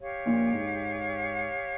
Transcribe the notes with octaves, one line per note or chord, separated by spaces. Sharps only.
G4 C#5 F5
A#1 A#2
G#2